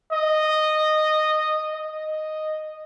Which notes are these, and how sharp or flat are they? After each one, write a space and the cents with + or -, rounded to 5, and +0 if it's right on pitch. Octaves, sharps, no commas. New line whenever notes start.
D#5 -10
D#5 -5